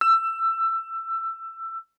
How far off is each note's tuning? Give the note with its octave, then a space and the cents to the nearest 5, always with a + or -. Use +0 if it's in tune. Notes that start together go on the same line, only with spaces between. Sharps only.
E6 +20